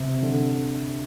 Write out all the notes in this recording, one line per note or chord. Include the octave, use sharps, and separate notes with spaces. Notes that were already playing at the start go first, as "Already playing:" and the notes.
Already playing: C3
D3